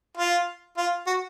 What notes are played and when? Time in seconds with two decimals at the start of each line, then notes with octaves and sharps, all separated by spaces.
0.17 F4
0.77 F4
1.07 F#4